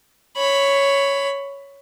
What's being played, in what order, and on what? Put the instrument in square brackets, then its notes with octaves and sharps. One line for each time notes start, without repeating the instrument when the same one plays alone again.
[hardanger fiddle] C#5 B5